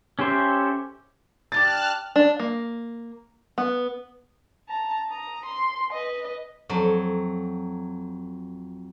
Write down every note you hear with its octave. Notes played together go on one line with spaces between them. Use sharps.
C#4 G4 A4 C5 E5
D4 F4 G4 A5 F6 F#6 A6
D4
A#3
B3
A5 A#5
A#5 D#6
C6
B4 D#5
F2 F#3